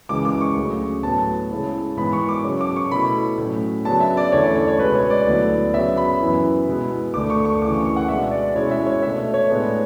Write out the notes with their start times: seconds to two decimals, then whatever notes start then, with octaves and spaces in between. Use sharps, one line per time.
0.09 C#2 C#3 E3 D6
0.25 D6
0.41 C#6
0.56 D2 C#3 F#3
1.03 A2 F#3 B3 A5
1.51 C#3 G#3 C#4 E4
1.97 G#2 E3 B3 B5
2.13 C#6
2.29 D6
2.44 C#3 F#3 C#4
2.61 D6
2.76 C#6
2.91 B2 A3 E4 B5
3.38 A2 F#3 C#4
3.85 C#3 F#3 B3 D4 A5
4.00 E5
4.17 D5
4.32 E2 D3 A3 C#4 E4 C#5
4.44 D5
4.55 C#5
4.68 C#5
4.79 C#2 B2 G#3 B4
4.95 C#5
5.10 D5
5.26 D2 D3 F#3 B3 E4
5.73 C#3 F#3 B3 E5
5.97 B5
6.20 F#2 E3 B3 E4
6.67 B2 G#3 B3 E4
7.14 D2 D3 A3 D6
7.30 C#6
7.45 C#6
7.62 D2 C#3 E3 D6
7.74 C#6
7.85 C#6
7.96 F#5
8.08 B2 G#3 D4 E5
8.31 D5
8.55 B2 G#3 C#4 E4 C#5
8.71 E5
8.86 C#5
9.03 B2 A3 D4 E5
9.34 C#5
9.50 A2 G#3 B3 D4